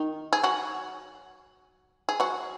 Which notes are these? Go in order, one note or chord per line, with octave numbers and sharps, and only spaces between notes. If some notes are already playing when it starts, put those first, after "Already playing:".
Already playing: D#3 D#4
G#4
F#3 F#4
G#4
F#3 F#4